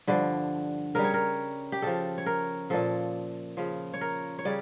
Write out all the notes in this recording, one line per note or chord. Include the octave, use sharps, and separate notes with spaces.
G2 D3 F3 D5
C#3 G3 A#4
C#5
A#4
G4
C#3 F3 A4
C#5
A#4
A#2 F3 A4
C#3 F3
C#5
A#4
C#5
C#3 G3 D5